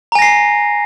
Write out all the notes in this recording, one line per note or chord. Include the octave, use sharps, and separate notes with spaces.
G#5 A#5 A#6 C7